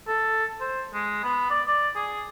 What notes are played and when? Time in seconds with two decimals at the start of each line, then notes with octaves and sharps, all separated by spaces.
0.08 A4
0.61 C5
0.94 G#3
1.24 B3
1.50 D5
1.68 D5
1.96 G#4